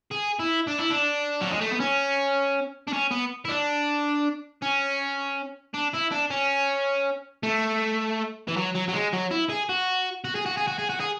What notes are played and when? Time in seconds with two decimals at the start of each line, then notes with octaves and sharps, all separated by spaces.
0.11 G#4
0.40 E4
0.68 D4
0.79 E4
0.91 D4
1.41 F#3
1.51 G#3
1.61 A3
1.71 B3
1.80 C#4
2.88 D4
2.93 C#4
3.11 B3
3.45 E4
3.49 D4
4.62 C#4
5.74 D4
5.93 E4
6.11 D4
6.31 C#4
7.43 A3
8.48 E3
8.57 F#3
8.75 F#3
8.88 F#3
8.93 G#3
9.13 F#3
9.31 E4
9.49 G#4
9.69 F#4
10.24 F#4
10.35 G#4
10.46 F#4
10.57 G#4
10.68 F#4
10.79 G#4
10.90 F#4
11.00 G#4